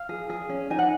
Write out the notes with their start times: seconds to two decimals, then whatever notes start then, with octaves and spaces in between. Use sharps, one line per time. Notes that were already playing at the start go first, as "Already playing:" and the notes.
Already playing: F5
0.09 G#4
0.30 G#4
0.49 C#4
0.70 D#4 G#5
0.79 F#5